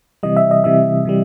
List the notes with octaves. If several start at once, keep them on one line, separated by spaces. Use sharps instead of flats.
C3 E3 G3 D#5
E5
D#5
C3 E3 G3 E5
C3 E3 G3